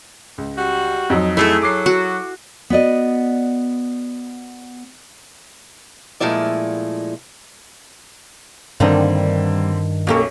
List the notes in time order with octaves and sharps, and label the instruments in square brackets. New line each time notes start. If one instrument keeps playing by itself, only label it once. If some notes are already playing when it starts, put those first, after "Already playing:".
[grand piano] C#2
[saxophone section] G3 F#4
[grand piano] F2 F#3 D#4
[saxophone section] A2 A3 [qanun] E4 G#4 A4
[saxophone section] F#3 [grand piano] D6 C7
[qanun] F#4 F#5
[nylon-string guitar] B3 F#4 D5 D#5
[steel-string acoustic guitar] A#2 F3 G#3 A3 E4 D5
[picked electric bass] G2 D#3 [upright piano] D3 C4 [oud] G3 A#3 D#4
[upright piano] B1 F#2 C#6 [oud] A#3 G4 A4